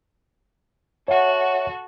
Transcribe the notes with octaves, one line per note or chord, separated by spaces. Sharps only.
F#4 A4 C#5 E5 F#5